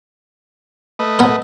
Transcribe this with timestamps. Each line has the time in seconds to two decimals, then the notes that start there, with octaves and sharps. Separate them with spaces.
0.99 A3 B4 D#5
1.19 B3 A#4